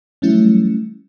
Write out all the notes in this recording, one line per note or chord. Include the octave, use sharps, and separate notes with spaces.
E3 F#3 G3 A3 C#4 E4